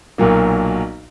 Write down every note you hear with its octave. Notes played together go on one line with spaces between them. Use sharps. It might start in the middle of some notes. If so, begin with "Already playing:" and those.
B1 A#2 F#3 A#3